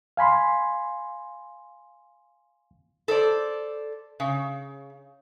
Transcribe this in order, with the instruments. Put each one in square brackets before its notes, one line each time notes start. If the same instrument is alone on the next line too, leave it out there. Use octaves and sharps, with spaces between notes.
[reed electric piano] F5 G#5 B5 C6
[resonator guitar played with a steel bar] A4 C5 D5
C#3